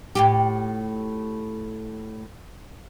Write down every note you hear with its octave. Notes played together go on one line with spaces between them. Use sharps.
A2 F4 G4